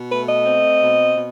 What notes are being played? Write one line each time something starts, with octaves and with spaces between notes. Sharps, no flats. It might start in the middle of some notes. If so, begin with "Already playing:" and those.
Already playing: B2
A3 B4
D#5
C4
B2
B2